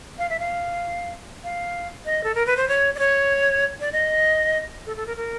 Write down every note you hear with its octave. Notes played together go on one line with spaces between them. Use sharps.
F5
E5
F5
F5
D#5
A4
A#4
B4
C5
C#5
D5
C#5
D5
D#5
A4
A4
A#4
A#4